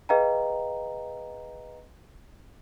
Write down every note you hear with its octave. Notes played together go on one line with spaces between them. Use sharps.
G#4 B4 D#5 F5 G5 A#5